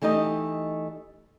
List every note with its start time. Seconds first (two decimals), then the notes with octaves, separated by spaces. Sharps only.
0.02 E3 A3 D#4 G4 D#5